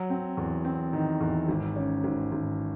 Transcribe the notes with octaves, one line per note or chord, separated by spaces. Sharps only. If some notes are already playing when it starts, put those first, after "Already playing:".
Already playing: F#3
C4
E2
C4
D#3
E2
G#1
C#4
G#1
G#1